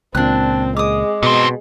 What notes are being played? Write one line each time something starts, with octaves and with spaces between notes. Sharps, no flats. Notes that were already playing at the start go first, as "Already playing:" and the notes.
C#2 A#2 C4 D4 F#6
G#3 D6 D#6
G#2 B2 C4